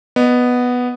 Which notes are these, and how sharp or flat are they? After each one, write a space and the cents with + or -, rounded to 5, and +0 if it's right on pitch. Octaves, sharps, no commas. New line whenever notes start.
B3 +0 D#5 -20